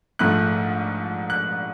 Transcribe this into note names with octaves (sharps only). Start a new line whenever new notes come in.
A#1 G#2 F3 A3 F#6
F#6